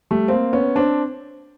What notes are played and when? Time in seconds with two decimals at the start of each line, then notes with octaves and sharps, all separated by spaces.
0.11 G3 A3
0.28 A#3 C4
0.53 B3 C#4
0.76 C4 D4